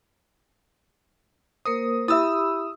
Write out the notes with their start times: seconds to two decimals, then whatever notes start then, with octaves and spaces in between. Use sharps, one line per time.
1.65 A#3 A#4 C5 D#6
2.08 E4 G4 E5 B5 D#6 E6